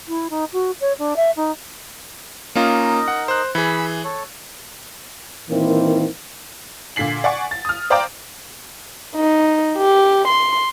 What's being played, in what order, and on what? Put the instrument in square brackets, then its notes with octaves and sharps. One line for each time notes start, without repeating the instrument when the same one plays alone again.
[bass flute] E4
D#4
F#4
C#5
D4
E5
D#4
[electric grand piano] A#3 C#4 F4 [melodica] D#4 A#4 D#5
[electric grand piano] F#5
C5 F#6
[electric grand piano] E3 G#4 [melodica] B5 E6
[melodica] A4 C#5
[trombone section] A#2 D#3 E3 A#3 C4 E4
[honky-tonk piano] A#2 D3 B6 C7 F#7
D5 F#5 G#5 C#6
A6
D#6 F6
C5 D5 F5 G5 A#5 D6
[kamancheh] D#4
G4
C6